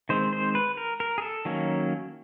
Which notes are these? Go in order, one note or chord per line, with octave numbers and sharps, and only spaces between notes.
D#3 G#3 C4 C5
C5
B4
A#4
A#4
G#4
A4
D#3 F#3 A#3 C#4